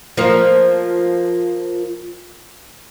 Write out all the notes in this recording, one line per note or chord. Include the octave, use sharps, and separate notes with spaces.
F3 A#3 F4